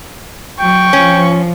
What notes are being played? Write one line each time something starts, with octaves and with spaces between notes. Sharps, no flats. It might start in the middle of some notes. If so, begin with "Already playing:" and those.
F#3 G5 C#6
F3 C#4